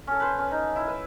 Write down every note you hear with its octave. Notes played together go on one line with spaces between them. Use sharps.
C#4 A4
B4 C5
C#4
D#4
E4
B4 E5